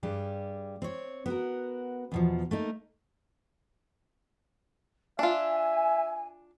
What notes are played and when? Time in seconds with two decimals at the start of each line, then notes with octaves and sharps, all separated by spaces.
0.03 G2 G3 G4 G#4
0.82 C4 C#5
1.26 B3 F#4 A#4
2.12 E2 B2 F3
2.51 A3 A#3 D#4
5.19 D4 F4 E5 G#5